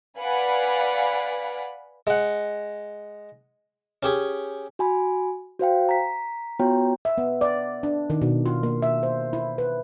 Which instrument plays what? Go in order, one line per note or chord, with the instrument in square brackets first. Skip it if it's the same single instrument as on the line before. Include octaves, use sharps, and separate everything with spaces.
[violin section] B4 D5 F5 F#5 G#5 B5
[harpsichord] G#3 F#5
C#4 G4 G#4
[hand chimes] F#4 G#5 B5
F#4 C5 F5 G5
A#5 B6
B3 F4 F#4 C#5 G5 A#5
[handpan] E5
B3
D5
D4
D#3
B2
F4
A#3
E5
C5
E4
B4